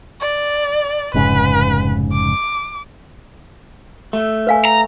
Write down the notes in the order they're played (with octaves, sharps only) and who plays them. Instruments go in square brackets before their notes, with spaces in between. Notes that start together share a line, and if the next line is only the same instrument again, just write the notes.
[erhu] D5
[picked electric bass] F1 G#2 C#3 [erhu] B4
[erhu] D6
[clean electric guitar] A3
[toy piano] B4 F5 G#5
[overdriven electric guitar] A#5